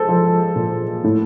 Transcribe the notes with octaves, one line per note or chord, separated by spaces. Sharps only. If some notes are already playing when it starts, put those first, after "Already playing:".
Already playing: G#3 A4 C5
F3
A#2
A2